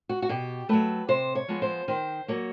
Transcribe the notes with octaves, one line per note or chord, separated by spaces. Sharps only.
F#4
F#4
B2 G4
F#3 A3 B4
C3 C5
C#5
F3 G#3 B3
C5
D#3 C5
F#3 A#3 C#5